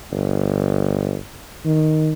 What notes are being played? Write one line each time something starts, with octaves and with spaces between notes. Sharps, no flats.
G1
D#3